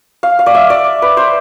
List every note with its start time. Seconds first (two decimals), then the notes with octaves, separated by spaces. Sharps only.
0.23 F5
0.39 F5
0.46 D5
0.55 E5
0.70 D5
1.02 B4
1.17 C5